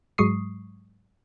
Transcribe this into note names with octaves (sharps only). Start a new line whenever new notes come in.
G#2 F#3 G#3 C#6 D#6 C7